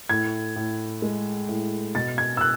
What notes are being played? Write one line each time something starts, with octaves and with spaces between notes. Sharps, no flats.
A2 G#6
A2
G#3
A2
B2 A6
G#6
E6
F#6